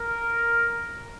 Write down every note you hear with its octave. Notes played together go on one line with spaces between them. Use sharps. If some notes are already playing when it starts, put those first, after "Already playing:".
Already playing: A#4